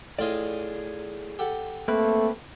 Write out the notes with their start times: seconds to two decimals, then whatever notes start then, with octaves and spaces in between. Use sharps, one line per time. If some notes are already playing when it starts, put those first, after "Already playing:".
0.19 A2 F4 G#4 D5 D#5
1.39 G4 A4 F#5
1.88 A3 A#3 C4 B4